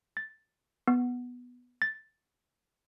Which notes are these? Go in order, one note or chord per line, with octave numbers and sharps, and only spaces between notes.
A6
B3
A6